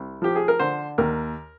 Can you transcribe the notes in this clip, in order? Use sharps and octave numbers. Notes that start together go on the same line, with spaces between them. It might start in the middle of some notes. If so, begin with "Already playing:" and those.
Already playing: C2
F3 G4
G#4
A#4
D3 C5
D#2 A#4